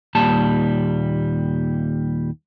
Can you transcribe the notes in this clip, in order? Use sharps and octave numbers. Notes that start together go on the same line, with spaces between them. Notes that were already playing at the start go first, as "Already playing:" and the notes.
D#2 A#2 G3 A5